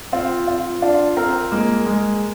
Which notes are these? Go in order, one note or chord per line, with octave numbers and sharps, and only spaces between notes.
C4 F4
F4
D4 F4
C4 A#4
G#3 A#3
G#3